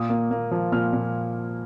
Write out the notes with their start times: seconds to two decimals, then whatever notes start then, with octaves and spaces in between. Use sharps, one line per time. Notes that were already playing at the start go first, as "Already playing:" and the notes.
Already playing: A#2 D#6
0.10 A#3
0.31 A#3
0.51 F3
0.72 A#2 F6
0.93 A#2